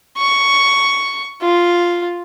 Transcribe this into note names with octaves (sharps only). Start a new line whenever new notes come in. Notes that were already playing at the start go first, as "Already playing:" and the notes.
C#6
F4